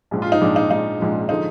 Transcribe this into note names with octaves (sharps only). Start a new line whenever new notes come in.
A#1 G#2 F3
F4
D#4
A#1 G#2 F3 D4
D#4
A#1 G#2 F3 D#4
A#1 G#2 F3
D3 F3 G#3 D#4